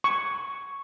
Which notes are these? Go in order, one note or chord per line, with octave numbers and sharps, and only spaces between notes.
C#6